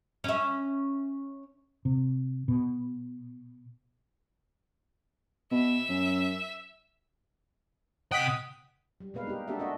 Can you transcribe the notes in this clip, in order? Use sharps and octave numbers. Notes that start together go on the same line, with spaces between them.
C#4 E5
C3
B2
B2 E5
F#2
C3 D#5 F#5 G5 D#6 B6
G3
B2 G#3 A#3 B4 F5
D#4 G4
A#3 D4 F#4 G4 A4 E5
D4 F#4 D#5 E5